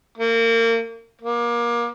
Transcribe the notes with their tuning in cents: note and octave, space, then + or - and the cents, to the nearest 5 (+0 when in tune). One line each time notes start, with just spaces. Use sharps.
A#3 -30
A#3 +25